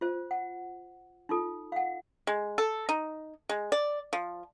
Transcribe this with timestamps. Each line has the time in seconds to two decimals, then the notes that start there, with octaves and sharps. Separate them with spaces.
0.01 F4 C5
0.31 F#5
1.29 D#4 F4 A4
1.72 F5 F#5
2.27 G#3
2.58 A4
2.89 D#4
3.49 G#3
3.72 D5
4.13 F3